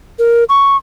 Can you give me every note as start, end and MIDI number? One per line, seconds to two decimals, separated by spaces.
0.19 0.44 70
0.49 0.77 85